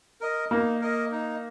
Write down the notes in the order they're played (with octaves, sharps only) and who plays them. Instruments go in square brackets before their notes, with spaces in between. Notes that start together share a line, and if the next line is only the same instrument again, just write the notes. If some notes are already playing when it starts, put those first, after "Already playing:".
[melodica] A#4 D#5
[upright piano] A#3 [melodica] D#4
[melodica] A#4 D#5
D#4